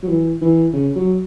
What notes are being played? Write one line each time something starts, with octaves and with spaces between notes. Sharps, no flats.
F#3
E3
E3
C#3
F#3